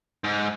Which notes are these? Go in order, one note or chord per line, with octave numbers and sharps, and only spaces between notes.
G#2